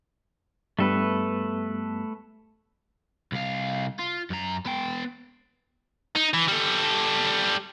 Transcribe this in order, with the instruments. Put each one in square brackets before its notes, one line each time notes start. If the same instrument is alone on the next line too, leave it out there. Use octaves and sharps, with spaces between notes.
[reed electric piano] G2 G3 B3 [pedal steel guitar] A3 A4 B4
[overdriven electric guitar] C2 F5
F4
F#2 A#5
B3 G5
[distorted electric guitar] D#4
E3
G3 A4